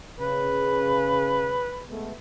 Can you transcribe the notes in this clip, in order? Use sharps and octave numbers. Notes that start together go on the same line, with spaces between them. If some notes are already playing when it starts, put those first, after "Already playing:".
C#3 B4
G#3 A3 B3